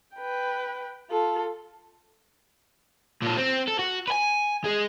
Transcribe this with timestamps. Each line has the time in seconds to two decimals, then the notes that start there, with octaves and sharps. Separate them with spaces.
0.16 B4 G5
1.10 F4 A4
3.22 A#2 A4
3.37 C4
3.67 A4
3.79 F#4
4.08 B4 G#5
4.64 G#3 G#4